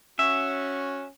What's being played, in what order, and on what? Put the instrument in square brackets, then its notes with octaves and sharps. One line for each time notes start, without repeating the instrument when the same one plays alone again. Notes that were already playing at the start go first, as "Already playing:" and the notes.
[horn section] C#4 F#4 [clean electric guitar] E5